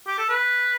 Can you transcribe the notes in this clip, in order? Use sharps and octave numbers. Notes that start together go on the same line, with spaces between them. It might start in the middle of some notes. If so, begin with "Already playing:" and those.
G4
A4
B4